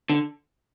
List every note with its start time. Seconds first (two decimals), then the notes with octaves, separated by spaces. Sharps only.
0.10 D3